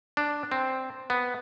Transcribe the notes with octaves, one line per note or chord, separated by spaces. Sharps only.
D4
C4
B3